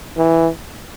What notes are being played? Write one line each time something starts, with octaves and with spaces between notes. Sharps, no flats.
E3